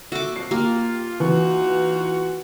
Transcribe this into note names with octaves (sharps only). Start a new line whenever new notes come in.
A#2 F#4 A4 E5 D6
F3 F#3 C7
A#3 F4 G4
E3 D#4 F4 F#4